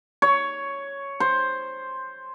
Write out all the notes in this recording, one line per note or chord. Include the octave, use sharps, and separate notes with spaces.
C#5
C5